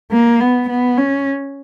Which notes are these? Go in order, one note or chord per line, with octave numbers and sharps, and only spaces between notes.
A#3
B3
B3
C#4